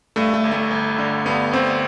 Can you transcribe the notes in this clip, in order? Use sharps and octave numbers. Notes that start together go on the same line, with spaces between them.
G2 A3
A3
G1
A3
G1
D3
G2 B3
G1 C4